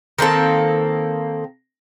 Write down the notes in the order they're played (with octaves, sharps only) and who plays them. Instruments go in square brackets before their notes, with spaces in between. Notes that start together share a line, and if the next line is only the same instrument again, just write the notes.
[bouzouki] D#3 A#3 C4 A4